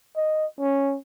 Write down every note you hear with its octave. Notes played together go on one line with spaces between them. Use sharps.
D#5
C#4